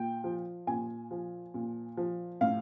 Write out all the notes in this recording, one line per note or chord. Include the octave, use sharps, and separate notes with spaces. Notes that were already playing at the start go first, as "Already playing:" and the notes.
Already playing: A#2 G5
F3
A#2 G#5
F3
A#2
F3
A2 F5